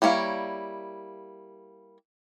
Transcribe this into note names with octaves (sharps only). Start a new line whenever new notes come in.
G3 A#3 E4 C#5 F5